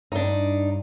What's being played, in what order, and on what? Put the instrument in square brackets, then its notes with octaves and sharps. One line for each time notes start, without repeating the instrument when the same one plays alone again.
[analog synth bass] G2 [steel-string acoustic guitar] D4 D#4